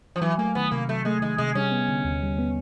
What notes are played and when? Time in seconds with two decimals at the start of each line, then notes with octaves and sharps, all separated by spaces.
0.16 F3
0.22 E3 F#3
0.38 A3 A#3
0.55 D#3 B3
0.71 C3 A#3
0.89 F#3 A3
1.05 G#3 A3
1.22 D#3 G#3
1.38 C3 G#3
1.55 G3 C#4
1.72 B3
1.88 D3
2.05 D#2
2.22 G3
2.38 B3